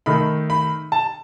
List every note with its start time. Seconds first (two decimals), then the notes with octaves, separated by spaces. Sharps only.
0.06 D#3 A3 D#4 B5
0.50 B5
0.92 A5